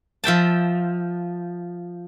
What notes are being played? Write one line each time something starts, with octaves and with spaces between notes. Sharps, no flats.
F3 E5 G5 A5